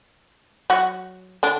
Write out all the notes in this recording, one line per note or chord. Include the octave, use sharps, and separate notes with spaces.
F#3 F#4
D3 D4